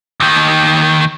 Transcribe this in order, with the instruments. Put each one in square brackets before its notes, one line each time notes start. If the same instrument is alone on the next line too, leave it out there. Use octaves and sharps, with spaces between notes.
[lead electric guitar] D#2 D#3